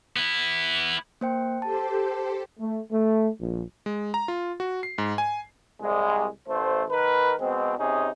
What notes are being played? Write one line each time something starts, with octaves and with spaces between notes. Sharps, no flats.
B3 E4
A#3 C5 G5
G4 A4 C5 A5
A3
A3
A#1
G#3
A#5
F4
F#4
C7
G#2
G#5
C2 G#3
A1 A3 C5
D#3 A#4 B4
B2 G#3 C4
C3 C#4 D#4 G#4